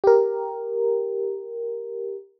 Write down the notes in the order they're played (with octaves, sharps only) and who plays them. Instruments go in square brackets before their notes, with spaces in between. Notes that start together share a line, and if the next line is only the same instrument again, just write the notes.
[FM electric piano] G4 A#4